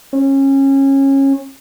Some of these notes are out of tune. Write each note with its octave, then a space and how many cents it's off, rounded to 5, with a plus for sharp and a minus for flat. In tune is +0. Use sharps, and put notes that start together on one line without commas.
C#4 -25